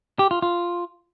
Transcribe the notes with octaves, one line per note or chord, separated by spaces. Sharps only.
G4
F4
F4